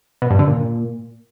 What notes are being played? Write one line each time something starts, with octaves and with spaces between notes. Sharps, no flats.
B2
G2
D3
A#2